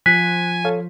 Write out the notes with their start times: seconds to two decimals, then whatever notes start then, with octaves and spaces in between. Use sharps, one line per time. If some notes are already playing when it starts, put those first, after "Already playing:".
0.06 F3 F4 G#5 F#6 B6
0.65 A4 C#5 F5